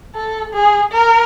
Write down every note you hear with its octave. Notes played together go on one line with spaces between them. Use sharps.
A4
G#4
A#4